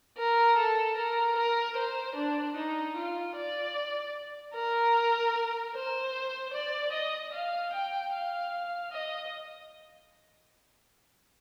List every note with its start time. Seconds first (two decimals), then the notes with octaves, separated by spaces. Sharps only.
0.18 A#4
0.58 A4
0.97 A#4
1.37 A#4
1.76 C5
2.16 D4
2.56 D#4
2.96 F4
3.35 D5
4.54 A#4
5.74 C5
6.54 D5
6.94 D#5
7.33 F5
7.72 G5
8.12 F5
8.91 D#5